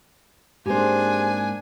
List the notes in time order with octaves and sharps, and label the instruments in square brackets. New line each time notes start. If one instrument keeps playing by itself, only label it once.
[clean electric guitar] G#2 A#3 C4 [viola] D4 G#5 [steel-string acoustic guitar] G4 G#4 C5